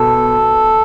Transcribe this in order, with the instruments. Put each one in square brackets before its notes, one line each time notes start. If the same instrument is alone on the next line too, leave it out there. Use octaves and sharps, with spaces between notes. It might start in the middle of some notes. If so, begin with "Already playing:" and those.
Already playing: [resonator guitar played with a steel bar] B2 [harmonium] A4